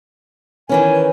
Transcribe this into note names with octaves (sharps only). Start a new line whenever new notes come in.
D#3 E3 C#4 G#5